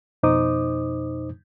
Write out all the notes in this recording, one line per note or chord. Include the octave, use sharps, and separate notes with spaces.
F2 B2 D#4 C5 D6 D#6